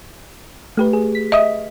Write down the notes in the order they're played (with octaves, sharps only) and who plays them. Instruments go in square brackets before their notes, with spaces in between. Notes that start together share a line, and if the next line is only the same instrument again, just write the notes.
[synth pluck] A3 G4 B4
G#4
B6
[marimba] D#5 E5 D#6